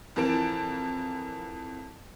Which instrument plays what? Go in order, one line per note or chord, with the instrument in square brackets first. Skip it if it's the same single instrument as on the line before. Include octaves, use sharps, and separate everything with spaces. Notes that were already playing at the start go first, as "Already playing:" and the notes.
[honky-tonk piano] F2 E3 A#4 A5 D7